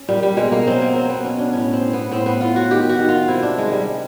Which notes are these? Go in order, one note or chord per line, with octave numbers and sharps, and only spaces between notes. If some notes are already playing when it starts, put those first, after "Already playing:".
Already playing: C#4
A#2 G3
G3
B2 G#3
A#3
F#3 C4
A#3
F#3 C4
B3
B2 C#4
D4
A2 C#4
C4
A2
B3
A2 C4
B3
A2 F4
F#4
D#3 G4
F#4
D#3
F4
C3 E4
D4
D#3 G#3
G3
G3